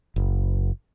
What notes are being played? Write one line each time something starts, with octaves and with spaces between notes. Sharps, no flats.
F#1